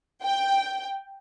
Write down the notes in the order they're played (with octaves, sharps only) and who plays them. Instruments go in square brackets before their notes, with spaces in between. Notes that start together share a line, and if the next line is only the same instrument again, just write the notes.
[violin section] G5